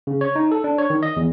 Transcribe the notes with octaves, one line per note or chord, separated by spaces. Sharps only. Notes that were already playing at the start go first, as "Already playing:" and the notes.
C#3
C#5
D#4
A4
D4
C#5
D#3
D#5
E2